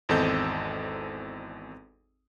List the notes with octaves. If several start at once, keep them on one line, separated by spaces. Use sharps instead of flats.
G#1 E2 C4 A4 D#5 G6